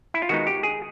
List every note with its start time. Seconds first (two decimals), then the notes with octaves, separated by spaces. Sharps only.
0.14 E4
0.22 F4
0.29 D#3 G#3 B3 D#4 F#4
0.47 G4
0.63 G#4